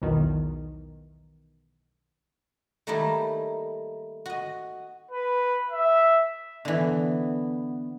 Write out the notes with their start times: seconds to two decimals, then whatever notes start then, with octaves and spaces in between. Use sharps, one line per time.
0.02 B1 E2 D#3
2.87 D#3 G3 A3 A#3 D#4 E4
4.26 F#4 D#5
5.11 B4
5.70 E5
6.65 D3 E3 B3